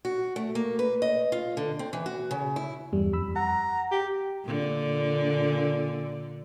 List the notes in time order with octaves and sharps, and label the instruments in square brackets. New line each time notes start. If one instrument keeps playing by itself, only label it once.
[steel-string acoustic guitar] F#4
A3
A#3
B4
D#5
F4
D3
C4
E3
F#4
C#3
E4
[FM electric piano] E2 G2 G3
F2 B5 E6
[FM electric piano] F#5 [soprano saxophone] A#5
[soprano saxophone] G4
[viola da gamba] A#2 D3